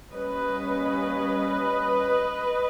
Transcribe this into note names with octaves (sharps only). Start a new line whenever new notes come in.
G3 A#3 C#4 B4 D#5